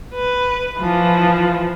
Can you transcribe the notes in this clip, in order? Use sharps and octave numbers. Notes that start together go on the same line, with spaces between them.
B4
E3 F3